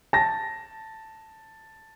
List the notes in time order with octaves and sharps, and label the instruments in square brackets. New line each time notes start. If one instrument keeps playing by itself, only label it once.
[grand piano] A5 A#6